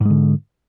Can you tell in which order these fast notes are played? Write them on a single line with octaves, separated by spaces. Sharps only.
G#2 G#3 D3